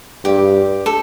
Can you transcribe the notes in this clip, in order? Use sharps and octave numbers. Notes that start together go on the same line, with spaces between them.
G2 G4
A4